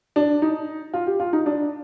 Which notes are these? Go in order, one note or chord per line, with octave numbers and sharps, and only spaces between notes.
D4
D#4
F4
G4
F4
D#4
D4